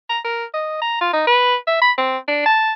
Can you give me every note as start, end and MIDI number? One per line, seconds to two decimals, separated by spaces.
0.10 0.20 82
0.24 0.45 70
0.54 0.77 75
0.82 1.00 82
1.01 1.11 65
1.13 1.25 63
1.27 1.56 71
1.67 1.80 76
1.81 1.92 83
1.98 2.17 60
2.28 2.45 62
2.46 2.73 81